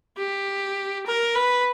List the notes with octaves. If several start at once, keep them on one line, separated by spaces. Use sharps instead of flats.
G4
A#4
B4